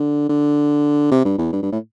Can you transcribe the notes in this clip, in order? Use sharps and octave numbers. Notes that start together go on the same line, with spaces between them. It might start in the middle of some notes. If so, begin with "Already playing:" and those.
Already playing: D3
D3
C3
G2
E2
G2
G2
A2